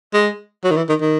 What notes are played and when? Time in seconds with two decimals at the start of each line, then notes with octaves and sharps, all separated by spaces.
0.13 G#3
0.64 F#3
0.71 D#3
0.77 E3
0.89 D#3
1.01 D#3